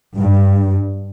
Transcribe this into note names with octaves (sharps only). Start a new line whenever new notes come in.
G2